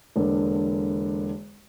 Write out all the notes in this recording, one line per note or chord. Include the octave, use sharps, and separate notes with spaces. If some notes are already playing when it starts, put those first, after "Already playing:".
E1 D3 A#3